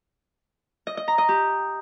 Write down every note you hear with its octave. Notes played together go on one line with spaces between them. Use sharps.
D#5
D#5
A#5
D#5
G4